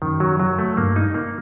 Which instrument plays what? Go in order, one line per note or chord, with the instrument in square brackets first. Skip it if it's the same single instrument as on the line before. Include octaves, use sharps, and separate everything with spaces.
[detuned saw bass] F#2 [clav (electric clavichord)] D#3
[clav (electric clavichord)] F#3
F#3
A3
[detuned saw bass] G2 [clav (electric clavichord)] A#3
[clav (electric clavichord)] D#4
A#3